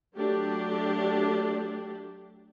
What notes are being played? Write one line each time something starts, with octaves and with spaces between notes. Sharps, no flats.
F#3 A3 D4 G4